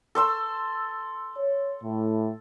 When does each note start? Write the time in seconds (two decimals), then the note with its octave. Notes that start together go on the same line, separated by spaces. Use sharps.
0.15 A4 C6 E6
1.37 C#5
1.83 A2